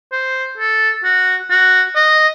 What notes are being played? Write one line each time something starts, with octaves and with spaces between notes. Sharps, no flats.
C5
A4
F#4
F#4
D#5